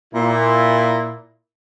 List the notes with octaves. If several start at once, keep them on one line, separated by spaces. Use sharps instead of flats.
A#2 E4